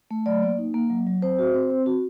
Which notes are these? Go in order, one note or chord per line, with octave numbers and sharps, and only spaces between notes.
A3
F#3 D5
A#3
D#4
A#3
F#3
F#3
C4 C5
F#4
C4
C4
F#4